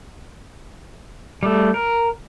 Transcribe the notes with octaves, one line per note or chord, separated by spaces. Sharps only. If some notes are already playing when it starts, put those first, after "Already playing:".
G3 A3
A#4